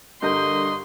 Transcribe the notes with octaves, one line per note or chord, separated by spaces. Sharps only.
G2 D3 A#4 D#5 C6 G6